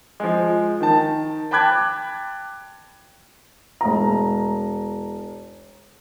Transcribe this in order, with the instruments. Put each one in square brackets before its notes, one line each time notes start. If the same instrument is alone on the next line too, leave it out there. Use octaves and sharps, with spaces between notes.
[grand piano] F3 G#3
D#3 A5
G5 A5 B5 D6 F#6 G#6
[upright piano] E1 A#5